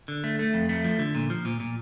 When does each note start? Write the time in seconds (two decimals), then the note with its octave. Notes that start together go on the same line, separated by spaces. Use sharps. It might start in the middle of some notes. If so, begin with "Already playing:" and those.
0.08 D3
0.24 A3
0.39 A3
0.54 F2
0.69 A3
0.84 F3
0.99 D3
1.15 A#2
1.30 F3
1.45 A#2
1.60 A#2